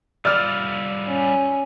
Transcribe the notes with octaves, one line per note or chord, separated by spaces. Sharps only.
G3 F4 D5 E6 F6
C#4